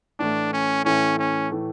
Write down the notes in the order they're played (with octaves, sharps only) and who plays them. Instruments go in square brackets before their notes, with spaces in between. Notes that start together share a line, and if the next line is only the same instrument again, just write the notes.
[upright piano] A2 E3 A3 [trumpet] D4
[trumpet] C#4
[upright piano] A2 E3 A3 [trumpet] C#4
[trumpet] C#4
[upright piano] A2 E3 A3